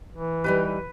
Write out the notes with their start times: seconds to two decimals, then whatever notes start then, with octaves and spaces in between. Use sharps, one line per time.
0.12 E3
0.44 G3 D#4 G4 B4